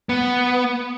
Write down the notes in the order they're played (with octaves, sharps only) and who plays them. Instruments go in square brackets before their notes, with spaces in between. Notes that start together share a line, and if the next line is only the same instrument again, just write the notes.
[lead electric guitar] B3